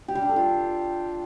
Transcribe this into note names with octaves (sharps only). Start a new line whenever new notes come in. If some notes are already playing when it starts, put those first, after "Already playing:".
G4
G3
D4
A4
F4